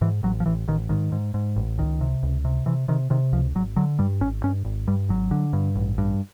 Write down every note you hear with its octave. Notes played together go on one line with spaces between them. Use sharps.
G#2 E3
A1 F#3
F3
A1 E3
A1 D#3
G#2 D#3
G#2
G#2
A1
C#2 D#3
C3
C#2
C3
C3 E3
C3 D#3
C3 D#3
C#2 F3
G#1 F#3
D3 F#3
G2 G3
G#1 C#4
G2 C#4
G#1
G2 G3
G#1 F#3
D3
G2
A1
G2